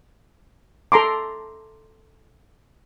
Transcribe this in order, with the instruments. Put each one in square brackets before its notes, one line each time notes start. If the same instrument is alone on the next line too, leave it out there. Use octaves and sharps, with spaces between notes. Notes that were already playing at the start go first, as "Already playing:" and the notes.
[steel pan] A4 A#5 C6 D6